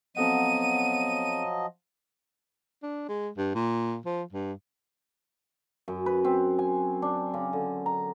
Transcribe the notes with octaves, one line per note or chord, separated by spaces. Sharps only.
F3 F#3 B3 C4 A4 D#5 F#5 D#7
D4
G#3
G2
A#2
F3
G2
F#2
B4
C4
G#5
D4
C#3
D3
A#5